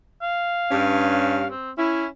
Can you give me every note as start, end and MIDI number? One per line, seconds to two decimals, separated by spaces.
0.23 1.46 77
0.71 1.47 43
0.71 1.47 61
1.50 1.71 60
1.78 2.07 61
1.78 2.05 64